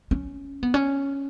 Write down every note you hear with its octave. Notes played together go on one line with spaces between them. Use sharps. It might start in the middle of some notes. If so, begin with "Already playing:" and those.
C#4
B3
C#4